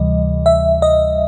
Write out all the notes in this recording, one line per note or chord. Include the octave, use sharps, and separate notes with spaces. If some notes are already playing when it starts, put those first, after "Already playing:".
Already playing: D2 C3 E3 G3 D#5
E5
D#5